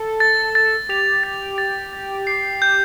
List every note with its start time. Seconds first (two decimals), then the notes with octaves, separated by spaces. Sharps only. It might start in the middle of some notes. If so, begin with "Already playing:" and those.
Already playing: A4
0.20 A6
0.55 A6
0.89 G4 F7
1.24 A6
1.58 A6
1.93 A6
2.27 C7
2.62 G6